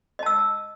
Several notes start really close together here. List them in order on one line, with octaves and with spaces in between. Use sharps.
D#5 A5 E6